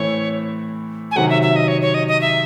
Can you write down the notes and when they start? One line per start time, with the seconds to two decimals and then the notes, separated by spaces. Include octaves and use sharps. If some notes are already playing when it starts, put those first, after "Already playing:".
Already playing: A2 E3 A3 C4 E4 C#5
1.11 G#5
1.16 C3 D#3 F#3 F#5
1.29 E5
1.42 E5
1.56 D#5
1.68 C#5
1.82 C#5
1.94 D#5
2.08 D#5
2.21 E5